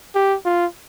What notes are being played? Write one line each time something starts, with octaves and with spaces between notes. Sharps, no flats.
G4
F4